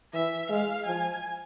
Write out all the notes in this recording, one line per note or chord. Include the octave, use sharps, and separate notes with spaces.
E3 E5
G#3 F5
F3 G#5